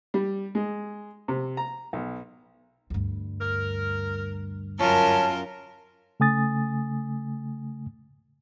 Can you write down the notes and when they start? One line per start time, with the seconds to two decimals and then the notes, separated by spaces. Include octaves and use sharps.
0.14 G3
0.55 G#3
1.28 C3
1.57 A#5
1.93 B1
2.90 D2 G2
3.41 A#4
4.79 F#2 C#4 F4 A#4 A5
6.20 C#3 A3 G#5 D#6 A6